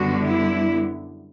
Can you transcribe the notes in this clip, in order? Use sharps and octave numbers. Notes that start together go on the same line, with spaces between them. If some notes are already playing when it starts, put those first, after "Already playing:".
Already playing: F#2 D3 G3 B3 F#4
E4